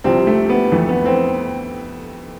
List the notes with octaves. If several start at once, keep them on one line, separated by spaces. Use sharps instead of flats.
C2 C3 F3 C4
A3
B3
F2 E3 A3
B3
C4